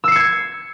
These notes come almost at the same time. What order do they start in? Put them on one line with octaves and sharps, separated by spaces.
E6 C7 C#7 G#6